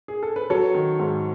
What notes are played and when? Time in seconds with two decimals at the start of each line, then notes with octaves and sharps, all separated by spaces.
0.08 G#4
0.23 A4
0.36 B4
0.50 F#3 A4 C#5
0.74 D#3
0.99 G#2